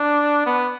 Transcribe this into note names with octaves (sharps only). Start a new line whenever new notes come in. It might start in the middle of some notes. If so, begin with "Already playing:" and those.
Already playing: D4
B3